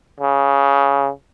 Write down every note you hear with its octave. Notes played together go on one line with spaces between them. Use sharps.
C#3